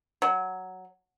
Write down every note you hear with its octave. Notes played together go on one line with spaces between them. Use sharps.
F#3